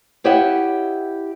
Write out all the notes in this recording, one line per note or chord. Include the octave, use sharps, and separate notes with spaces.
E4 G4 C#5 D#5 E5 F#5